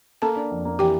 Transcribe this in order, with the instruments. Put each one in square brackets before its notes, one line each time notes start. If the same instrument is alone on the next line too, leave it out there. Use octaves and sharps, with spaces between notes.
[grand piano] A#3 [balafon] A4 A5
[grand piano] D4
F2
A#3
[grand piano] E3 [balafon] G4 G5